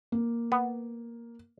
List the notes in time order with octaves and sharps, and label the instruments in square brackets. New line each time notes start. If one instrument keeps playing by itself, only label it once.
[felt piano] A#3
[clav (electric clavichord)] B3